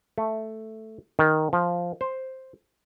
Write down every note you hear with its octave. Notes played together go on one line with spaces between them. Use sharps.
A3
D#3
F3
C5